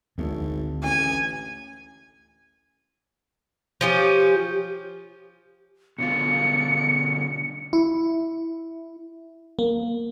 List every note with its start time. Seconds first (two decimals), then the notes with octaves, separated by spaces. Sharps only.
0.18 G#1 D2
0.83 A1 G#5
3.81 F3 C#4 G4
5.98 B2 D3 F4 C#7
7.73 E4
9.59 A#3